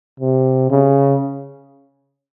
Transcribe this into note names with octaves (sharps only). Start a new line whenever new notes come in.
C3
C#3